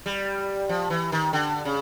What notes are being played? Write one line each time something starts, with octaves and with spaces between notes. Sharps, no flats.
G3
F3
E3
D#3
D3
C#3